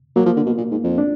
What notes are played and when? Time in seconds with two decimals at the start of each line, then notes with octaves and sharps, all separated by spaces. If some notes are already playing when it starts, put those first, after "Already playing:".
0.16 F#3 A#3
0.26 F3
0.36 D3
0.46 B2
0.57 A#2
0.71 G#2
0.84 F2
0.98 D4